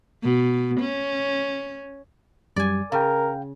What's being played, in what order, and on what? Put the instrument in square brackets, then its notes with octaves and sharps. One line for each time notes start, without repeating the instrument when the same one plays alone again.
[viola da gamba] B2
C#4
[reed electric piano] F#2 G3 [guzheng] D5 G#5
[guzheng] C#3 [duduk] A#4 [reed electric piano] F5 G5